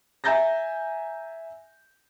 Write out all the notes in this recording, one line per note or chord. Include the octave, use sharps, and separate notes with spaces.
E5 G#5 A#5 G6 A6 A#6